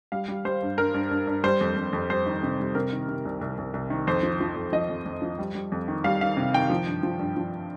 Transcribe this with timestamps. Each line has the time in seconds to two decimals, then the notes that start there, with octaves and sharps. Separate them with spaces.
0.12 G3 F5
0.28 G3
0.45 G3 C5
0.62 G2
0.78 G2 A#4
0.94 G2
1.11 G2
1.27 G2
1.44 G3 C5
1.61 F2
1.77 F2
1.93 F2
2.10 G3 C5
2.26 D#3
2.43 C3
2.59 G3
2.75 C3 A#4
2.92 D#3
3.08 C3
3.25 C2
3.41 C2
3.58 C2
3.74 C2
3.90 D#3
4.07 F2 C5
4.23 F3
4.41 F3
4.56 F2
4.72 F3 D#5
4.90 F2
5.06 F2
5.22 F3
5.39 G3
5.55 G3
5.72 F2
5.88 D#3
6.04 G3 F5
6.21 D#3 F5
6.37 C3
6.54 D#3 G5
6.70 F3
6.87 G2
7.03 F3
7.19 G2
7.37 F3